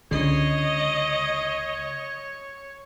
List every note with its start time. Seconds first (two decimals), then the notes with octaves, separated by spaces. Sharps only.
0.11 C#2 D3 C#5 D#5 C7